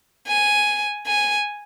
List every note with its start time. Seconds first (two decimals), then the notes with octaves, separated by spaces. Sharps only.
0.28 G#5
1.07 G#5